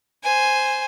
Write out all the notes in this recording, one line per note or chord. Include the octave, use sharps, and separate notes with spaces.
C5 G#5